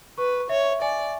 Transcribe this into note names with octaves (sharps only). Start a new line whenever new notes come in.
B4 C#6
C#5 E5
D5 G#5